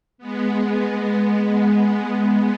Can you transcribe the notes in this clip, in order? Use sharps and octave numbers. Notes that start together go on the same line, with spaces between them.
G#3 B3